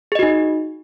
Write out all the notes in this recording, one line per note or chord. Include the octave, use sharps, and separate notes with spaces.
D#4 F#4 G#4 D#5